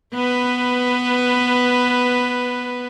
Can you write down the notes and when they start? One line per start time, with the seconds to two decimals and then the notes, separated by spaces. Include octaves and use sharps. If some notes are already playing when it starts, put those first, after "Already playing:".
0.14 B3 B4